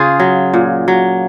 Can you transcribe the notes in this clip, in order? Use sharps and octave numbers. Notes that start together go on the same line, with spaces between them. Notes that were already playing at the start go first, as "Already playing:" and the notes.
Already playing: C#3 F4 G#4
F#3
A#2
F#3